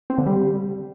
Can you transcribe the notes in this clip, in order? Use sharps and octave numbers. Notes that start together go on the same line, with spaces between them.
C4
D3
G3